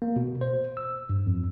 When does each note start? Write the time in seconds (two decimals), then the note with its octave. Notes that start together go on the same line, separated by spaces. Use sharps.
0.02 A#3
0.16 B2
0.41 C5
0.77 E6
1.10 G2
1.26 F2